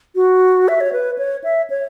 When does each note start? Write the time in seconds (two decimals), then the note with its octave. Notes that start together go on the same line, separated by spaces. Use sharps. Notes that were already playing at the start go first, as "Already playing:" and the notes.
0.15 F#4
0.68 E5
0.81 C#5
0.93 B4
1.18 C#5
1.44 E5
1.70 C#5